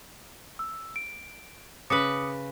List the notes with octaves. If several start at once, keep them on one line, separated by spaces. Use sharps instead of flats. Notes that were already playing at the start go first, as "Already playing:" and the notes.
E6
D7
C#3 B4 D6 D#6 C#7